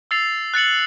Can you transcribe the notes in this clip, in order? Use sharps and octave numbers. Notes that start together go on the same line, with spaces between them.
E6 A6 C7 F7
F#6 A6 C#7 F#7